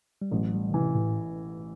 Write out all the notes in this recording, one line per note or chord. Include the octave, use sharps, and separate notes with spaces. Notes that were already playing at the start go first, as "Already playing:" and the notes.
G3
A1 F#3
G3
D#3
C3 E3
A2